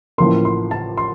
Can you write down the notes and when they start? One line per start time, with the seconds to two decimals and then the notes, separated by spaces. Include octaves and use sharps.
0.18 A1 A2 F3 A#3 C6
0.45 C6
0.71 A5
0.97 C6